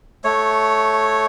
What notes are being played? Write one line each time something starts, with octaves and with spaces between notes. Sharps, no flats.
A3 C#5